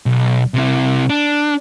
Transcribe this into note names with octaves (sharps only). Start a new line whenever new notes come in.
B1
C3 E4
D4